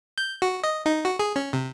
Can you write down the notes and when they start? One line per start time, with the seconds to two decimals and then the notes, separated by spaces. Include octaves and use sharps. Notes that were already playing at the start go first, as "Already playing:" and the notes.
0.18 G6
0.42 F#4
0.64 D#5
0.86 D#4
1.05 F#4
1.19 G#4
1.36 C#4
1.53 C3